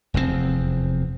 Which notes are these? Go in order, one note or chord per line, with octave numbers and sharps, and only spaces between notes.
F1 E2 G2 C4